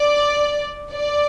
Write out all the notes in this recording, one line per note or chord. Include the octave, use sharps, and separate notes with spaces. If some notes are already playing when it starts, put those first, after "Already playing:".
Already playing: D5
D5